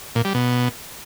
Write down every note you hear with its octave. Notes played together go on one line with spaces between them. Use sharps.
A#2
G3
B2